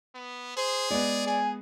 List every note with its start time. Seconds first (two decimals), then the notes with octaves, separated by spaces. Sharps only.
0.14 B3
0.57 G#4 C5
0.90 G#3 B3 D5
1.27 G#4 G#5